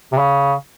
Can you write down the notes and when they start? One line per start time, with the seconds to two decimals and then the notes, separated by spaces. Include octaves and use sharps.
0.12 C3
0.18 C#3